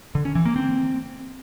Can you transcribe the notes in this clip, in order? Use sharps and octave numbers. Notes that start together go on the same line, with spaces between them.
D3
C#4
E3
A#3
C4